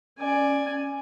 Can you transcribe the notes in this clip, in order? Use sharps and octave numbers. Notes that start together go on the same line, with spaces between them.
C#4 D5 G#5